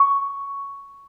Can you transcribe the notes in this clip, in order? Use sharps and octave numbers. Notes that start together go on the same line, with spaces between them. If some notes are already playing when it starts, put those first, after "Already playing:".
Already playing: C#6